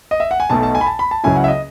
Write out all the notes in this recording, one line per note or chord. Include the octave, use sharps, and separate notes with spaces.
D#5
E5
F#5
G#5
B1 B2 A3 A5
A5
G#5
B5
A5
B5
A5
C#2 C#3 F#3 C#4 E4 G#5
F#5
E5
D#5